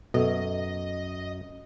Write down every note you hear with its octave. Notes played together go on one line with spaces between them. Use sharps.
F#2 B2 A4 D#5